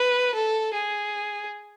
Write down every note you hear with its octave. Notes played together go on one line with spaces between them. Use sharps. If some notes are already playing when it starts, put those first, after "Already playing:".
Already playing: B4
A4
G#4